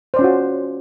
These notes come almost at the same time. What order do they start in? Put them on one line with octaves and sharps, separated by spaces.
C5 D5 C#4 F4 F#4